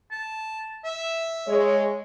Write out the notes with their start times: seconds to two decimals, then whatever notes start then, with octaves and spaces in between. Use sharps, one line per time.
0.11 A5
0.84 E5
1.48 G#3 C#5